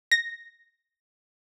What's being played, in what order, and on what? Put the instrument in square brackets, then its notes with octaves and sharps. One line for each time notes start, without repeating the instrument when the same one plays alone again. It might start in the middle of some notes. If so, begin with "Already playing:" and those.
[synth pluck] A#6